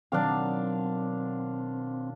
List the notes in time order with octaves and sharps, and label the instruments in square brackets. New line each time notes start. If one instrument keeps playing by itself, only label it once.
[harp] B2 D#3 F#3 [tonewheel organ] C4 [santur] D4 D5 F5